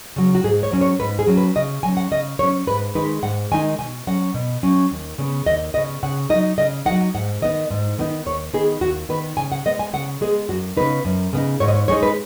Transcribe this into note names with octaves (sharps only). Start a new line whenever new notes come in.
C#3 F#3
F#4
G#2 G#4
C#5
F#3 C#4
C#5
G#2 B4
G#4
F#3 C#4
B4
C#3 D#5
F#3 C#4 G#5
F#5
C#3 D#5
F#3 C#4 C#5
G#2 B4
D#3 G#3 D#4 B4
G#2 F#5
D#3 G#3 D#4 G#5
B2 G#5
F#3 C#4 F#5
B2
F#3 C#4
D#2
C#3 B3
D#2 D#5
C#3 B3 D#5
C#3 F#5
F#3 D#4 D#5
C#3 D#5
F#3 D#4 F#5
G#2 F#5
D#3 B3 D#4 D#5
G#2
D#3 B3 D#4
D#2 C#5
D#3 B3 D#4 G#4
D#2 F#4
D#3 B3 D#4 B4
C#3 G#5
F#5
G#3 B3 D#5
G#5
C#3 F#5
G#3 B3 G#4
F#2 F#4
C#3 B3 D#4 B4
F#2
C#3 B3 D#4
G#2 C#5
D#5
C#5
G#3 D#4 C#5
B4